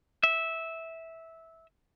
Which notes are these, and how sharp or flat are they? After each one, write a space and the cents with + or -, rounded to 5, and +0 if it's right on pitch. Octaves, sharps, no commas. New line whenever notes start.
E5 -15